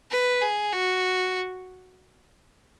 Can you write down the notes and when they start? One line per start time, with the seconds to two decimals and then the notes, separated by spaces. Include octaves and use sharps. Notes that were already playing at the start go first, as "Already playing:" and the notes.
0.11 B4
0.42 G#4
0.73 F#4